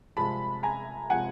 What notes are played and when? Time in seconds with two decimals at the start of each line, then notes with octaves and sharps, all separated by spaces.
0.17 C2 C3 F3 G#3 A5 B5
0.63 G#5 A#5
1.10 C3 F3 G#3 F#5 G#5